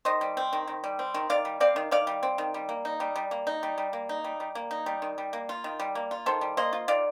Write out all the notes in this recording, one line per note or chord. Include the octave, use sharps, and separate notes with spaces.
D#3 C5 D#5
G3
C4
D#3
D#3
G3
C4
D#3
D#3 D5 F5
G3
C4 D5 F5
D#3
D#3 D5 F5
G3
C4
D#3
G3
A#3
D#4
G3
G3
A#3
D#4
G3
G3
A#3
D#4
G3
G3
A#3
D#4
G3
D#3
G3
A#3
F4
D#3
G3
A#3
F4
D#3 A4 C5
G3
A#3 C5 D#5
F4
D#3 D5 F5